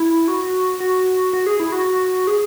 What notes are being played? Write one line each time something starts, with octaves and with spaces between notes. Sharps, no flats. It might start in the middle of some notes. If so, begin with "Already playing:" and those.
Already playing: E4
F#4
F#4
F#4
G#4
E4
F#4
F#4
G#4